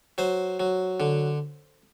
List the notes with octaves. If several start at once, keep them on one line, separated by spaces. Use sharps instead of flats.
F#3 C5
F#3
D3